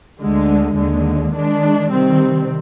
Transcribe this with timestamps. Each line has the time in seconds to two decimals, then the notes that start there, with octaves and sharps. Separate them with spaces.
0.20 D2 D3 G#3
0.77 D#2 D3 G#3
1.34 D#3 G#3 D4
1.91 C3 D#3 G3 C4